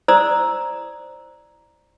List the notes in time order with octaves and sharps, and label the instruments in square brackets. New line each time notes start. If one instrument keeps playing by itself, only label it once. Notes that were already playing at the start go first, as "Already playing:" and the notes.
[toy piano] E4 C5 D5 A#5 D#6 E6